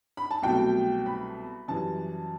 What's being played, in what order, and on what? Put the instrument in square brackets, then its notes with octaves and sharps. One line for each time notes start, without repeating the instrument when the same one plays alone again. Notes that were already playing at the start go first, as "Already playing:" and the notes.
[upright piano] B5
A5
C2 B2 F#3 A3 G5
B5
F#2 E3 G3 A5